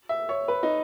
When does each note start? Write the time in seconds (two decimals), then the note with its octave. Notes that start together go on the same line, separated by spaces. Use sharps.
0.09 E5
0.29 C#5
0.48 B4
0.63 D#4